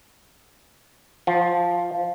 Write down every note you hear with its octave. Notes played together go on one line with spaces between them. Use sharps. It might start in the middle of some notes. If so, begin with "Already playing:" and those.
F3